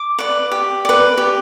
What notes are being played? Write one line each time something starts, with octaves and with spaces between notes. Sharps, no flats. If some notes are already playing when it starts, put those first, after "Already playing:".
Already playing: D6
B4 D5
G4
B4 D5
G4